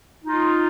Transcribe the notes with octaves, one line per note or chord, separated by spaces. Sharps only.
D#4 F4